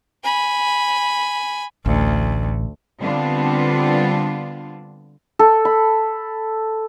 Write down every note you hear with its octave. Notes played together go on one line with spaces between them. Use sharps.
G#5 B5
A1 D2
D3 G3 B3 C4 D4 F4
A4
B5